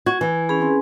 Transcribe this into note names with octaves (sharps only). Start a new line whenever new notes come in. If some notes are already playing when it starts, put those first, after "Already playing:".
F#4 G#6
E3 G#5
C#4 G#4 B5
C4 G#5 C6